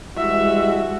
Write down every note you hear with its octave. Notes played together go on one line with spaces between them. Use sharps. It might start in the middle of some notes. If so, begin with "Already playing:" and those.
E3 G3 G#3 F#4 E5